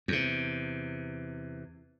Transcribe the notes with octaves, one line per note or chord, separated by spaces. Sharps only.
E2 C3